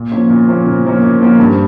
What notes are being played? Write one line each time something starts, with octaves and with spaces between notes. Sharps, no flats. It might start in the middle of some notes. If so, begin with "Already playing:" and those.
Already playing: A#2
F3 A#3 C#4
A#2
F3 A#3 C#4
A#2
F3 A#3 C#4
A#2
F3 A#3 C#4
G2